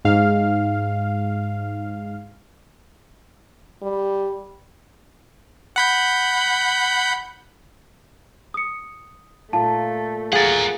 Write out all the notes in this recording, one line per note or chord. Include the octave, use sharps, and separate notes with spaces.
G#2 F5
G3
F#5 B5 G6
D#6 C#7
A#2 A3 A5
G#4 A#4 F5 F#5 A6